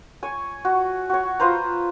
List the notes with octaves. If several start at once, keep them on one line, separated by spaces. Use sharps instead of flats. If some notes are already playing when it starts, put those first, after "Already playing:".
C#5 G#5
F#4
F#4 C#5
F4 B4 C5 A#5